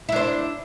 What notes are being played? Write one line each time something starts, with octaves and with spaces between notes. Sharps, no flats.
D4 E4 C5